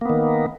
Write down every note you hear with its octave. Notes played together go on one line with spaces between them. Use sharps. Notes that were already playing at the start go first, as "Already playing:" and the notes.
D#3 A#3 B3